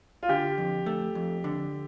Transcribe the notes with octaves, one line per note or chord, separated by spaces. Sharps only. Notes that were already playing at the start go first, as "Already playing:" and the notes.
F4
D3 G4
F2
A3
F2
D3